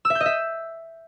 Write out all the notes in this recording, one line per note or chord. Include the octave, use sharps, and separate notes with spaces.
E6
E5
G6
D#5
E5